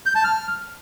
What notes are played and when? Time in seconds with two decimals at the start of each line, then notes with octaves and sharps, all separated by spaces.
0.06 G6
0.15 A5
0.24 F6